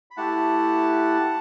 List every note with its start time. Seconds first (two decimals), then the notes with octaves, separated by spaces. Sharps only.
0.11 B5
0.17 A3 E4 G4 F#5 A5